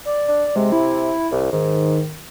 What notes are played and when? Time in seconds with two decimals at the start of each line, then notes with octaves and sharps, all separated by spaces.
0.05 D5
0.28 D4
0.56 C3 G#3
0.72 E4
1.32 C2
1.52 G#2 D#3